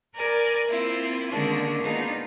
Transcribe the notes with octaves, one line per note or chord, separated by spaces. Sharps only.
A#4 B4 D5 G#5
A#3 C4 E4 F4
D3 D#3 G#3 A#3 C#4 D4
A#3 B3 D4 D#4 F4 G#4